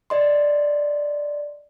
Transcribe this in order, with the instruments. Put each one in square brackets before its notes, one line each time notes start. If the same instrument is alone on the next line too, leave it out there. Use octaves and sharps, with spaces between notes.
[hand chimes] D5 D#5 C6